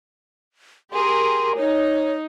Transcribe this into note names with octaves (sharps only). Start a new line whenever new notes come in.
G4 G#4 A#4 C6
D#4 C#5